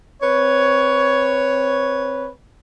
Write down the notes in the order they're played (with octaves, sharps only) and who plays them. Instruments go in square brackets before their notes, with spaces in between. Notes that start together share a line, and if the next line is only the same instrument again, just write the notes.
[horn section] C4 B4 C#5